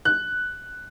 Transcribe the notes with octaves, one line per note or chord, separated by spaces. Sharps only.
F#6